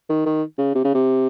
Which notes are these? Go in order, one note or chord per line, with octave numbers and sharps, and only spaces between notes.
D#3
D#3
C#3
C3
C#3
C3